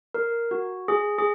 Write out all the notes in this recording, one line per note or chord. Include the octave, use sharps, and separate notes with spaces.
A#4
F#4
G#4
G#4